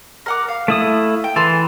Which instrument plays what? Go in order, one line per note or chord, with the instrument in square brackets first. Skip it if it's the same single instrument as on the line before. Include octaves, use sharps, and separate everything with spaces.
[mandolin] A#4 F#5 D6
F5
[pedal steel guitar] A3 E4 D#6
[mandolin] G5
[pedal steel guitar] E3 [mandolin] A4 G#5 C6